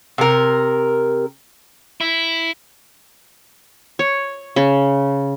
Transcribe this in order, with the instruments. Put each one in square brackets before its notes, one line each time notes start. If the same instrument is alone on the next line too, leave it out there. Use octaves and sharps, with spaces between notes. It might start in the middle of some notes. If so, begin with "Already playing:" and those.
[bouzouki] C3 A#4
[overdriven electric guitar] E4
[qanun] C#5
C#3